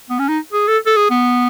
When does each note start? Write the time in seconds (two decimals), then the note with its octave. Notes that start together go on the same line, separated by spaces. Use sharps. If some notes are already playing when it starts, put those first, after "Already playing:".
0.10 B3
0.19 C#4
0.28 D#4
0.53 G#4
0.67 A4
0.86 A4
0.96 G#4
1.10 B3